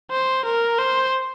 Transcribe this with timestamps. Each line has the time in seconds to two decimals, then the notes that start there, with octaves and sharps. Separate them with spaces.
0.12 C5
0.45 A#4
0.79 C5